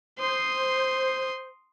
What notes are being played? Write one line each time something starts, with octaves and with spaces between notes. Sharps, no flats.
C5 C6 D#6